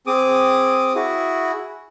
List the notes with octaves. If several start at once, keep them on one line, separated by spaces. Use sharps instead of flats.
C4 G#4 D6 D#6
E4 F#4 G#4